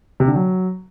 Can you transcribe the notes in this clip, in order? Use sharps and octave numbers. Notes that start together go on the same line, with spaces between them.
C3
D3
F#3